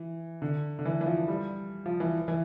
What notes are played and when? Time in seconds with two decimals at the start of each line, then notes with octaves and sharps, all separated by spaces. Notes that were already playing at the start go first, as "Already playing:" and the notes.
Already playing: E3
0.42 D3
0.79 D3
0.85 E3
1.01 E3
1.06 F3
1.28 G3
1.86 F3
2.00 E3
2.28 E3